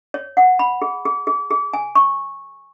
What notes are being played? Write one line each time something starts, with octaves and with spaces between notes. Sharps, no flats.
C#5
F#5
B5
G#4
G#4
G#4
G#4
G#5
C#6